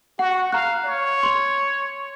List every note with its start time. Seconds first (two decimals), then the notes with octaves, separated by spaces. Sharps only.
0.19 F#4 F#5
0.52 F5 A#5 F#6
0.85 C#5
1.23 C6 F7